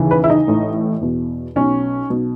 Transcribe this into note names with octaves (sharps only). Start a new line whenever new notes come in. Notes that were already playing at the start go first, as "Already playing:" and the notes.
Already playing: D#2 C#3 E3
B4
E4
D#4
A1 A2 E3
E2 B2
B1 B2 C#4
B1 B2